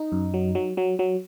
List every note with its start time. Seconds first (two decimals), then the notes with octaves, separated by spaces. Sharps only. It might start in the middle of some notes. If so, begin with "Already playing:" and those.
Already playing: D#4
0.12 F#2
0.34 F#3
0.55 F#3
0.77 F#3
0.99 F#3